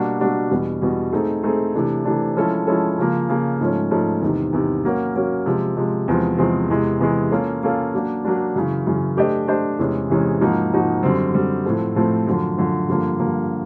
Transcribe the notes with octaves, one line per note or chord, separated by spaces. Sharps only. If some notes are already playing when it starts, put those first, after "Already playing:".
Already playing: B2 G3 A#3 D4 F#4
B2 G3 A#3 D4 F#4
E2 B2 G3
E2 B2 G3
A3 C4 D#4 G#4
A3 C4 D#4 G#4
C3 E3 A3 D4
C3 E3 A3 D4
F3 G#3 C#4 E4 A4
F3 G#3 C#4 E4 A4
C#3 F3 A#3
C#3 F3 A#3
G#2 F3 A3 C#4
G#2 F3 A3 C#4
E2 C3 D#3
E2 C3 D#3
F#3 A#3 C#4 F#4 A#4
F#3 A#3 C#4 F#4 A#4
C3 F3 G#3
C3 F3 G#3
E2 C3 F3 G#3 C4
E2 C3 F3 G#3 C4
E2 C3 E3 G#3
E2 C3 E3 G#3
A#3 C#4 F4 A4
A#3 C#4 F4 A4
F#3 A#3 D4
F#3 A#3 D4
F#2 C#3 E3
F#2 C#3 E3
A3 D4 G4 C5 D#5
A3 D4 G4 C5 D#5
E2 C3 E3 G#3 C#4
E2 C3 E3 G#3 C#4
G#2 F3 A#3 D#4 F#4
G#2 F3 A#3 D#4 F#4
F#2 D3 G3 C4
F#2 D3 G3 C4
A2 F3 A3 C4
A2 F3 A3 C4
F#2 D3 F3
F#2 D3 F3
G2 D3 F3 A#3
G2 D3 F3 A#3